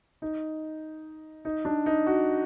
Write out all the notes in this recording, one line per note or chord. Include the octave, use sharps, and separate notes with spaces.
D#4
D#4
D4
D#4
F#4